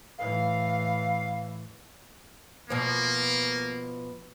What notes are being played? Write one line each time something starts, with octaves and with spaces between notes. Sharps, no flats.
A2 E3 F5
B2 F3 A#3